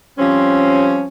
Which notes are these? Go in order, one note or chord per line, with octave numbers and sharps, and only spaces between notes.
F3 G3 C4 C#4